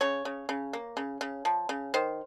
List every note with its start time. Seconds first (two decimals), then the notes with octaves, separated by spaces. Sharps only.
0.01 C#3 C#5
0.25 C#3
0.49 C#3
0.73 A#3
0.97 C#3
1.21 C#3
1.45 F3
1.69 C#3
1.94 D#3 C5